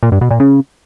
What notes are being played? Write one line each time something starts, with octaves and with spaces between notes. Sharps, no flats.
A#2
G2
B2
A#2
C#3